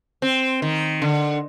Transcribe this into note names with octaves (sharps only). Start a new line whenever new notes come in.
C4
D#3
D3